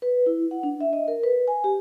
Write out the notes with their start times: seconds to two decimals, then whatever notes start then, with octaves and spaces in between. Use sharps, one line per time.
0.02 B4
0.26 E4
0.51 F#5
0.63 D4
0.81 E5
0.93 D#5
1.08 A#4
1.24 B4
1.48 G#5
1.64 G4